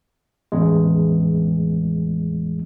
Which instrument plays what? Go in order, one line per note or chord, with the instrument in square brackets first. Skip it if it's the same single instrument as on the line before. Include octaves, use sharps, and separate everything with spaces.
[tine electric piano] A1 E2 G#3